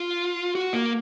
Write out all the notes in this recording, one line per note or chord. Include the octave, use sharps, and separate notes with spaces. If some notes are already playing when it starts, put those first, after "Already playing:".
Already playing: F4
F#4
A#3